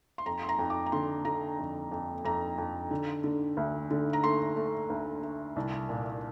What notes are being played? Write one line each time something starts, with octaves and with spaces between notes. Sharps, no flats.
C6
F2 A#5
C6
A#5
F2
D6
A#5
D3 C6
D3 A#5
F2
F2
F2 A#5
F2
D3
D3
D2
D3
A#5
A3 C6
A3
D2
A3
C2
A#2